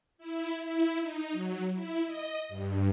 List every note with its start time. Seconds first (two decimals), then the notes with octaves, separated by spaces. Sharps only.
0.18 E4
0.64 E4
1.01 D#4
1.32 F#3
1.74 E4
2.06 D#5
2.49 G2